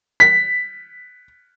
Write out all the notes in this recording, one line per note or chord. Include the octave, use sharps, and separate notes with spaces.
B6